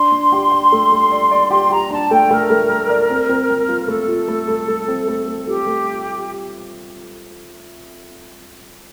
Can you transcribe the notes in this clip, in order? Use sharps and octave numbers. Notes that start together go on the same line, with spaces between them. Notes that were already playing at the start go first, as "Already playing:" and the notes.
Already playing: D4 C6
D4
G4
G4
A3
A3
D5
D5
G4 C6
G4 A#5
D4 A5
A3 G5
A3 A#4
A3
A3
D5
C4
C4
C4
F4
A#4
A3 A4
F4
A3
A3
A3
C4
A3
A3
F4 G4
A3